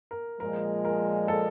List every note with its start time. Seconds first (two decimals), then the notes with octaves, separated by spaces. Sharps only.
0.11 A#4
0.40 A#2 F3 G#3 A#4
0.85 A#4
1.28 A4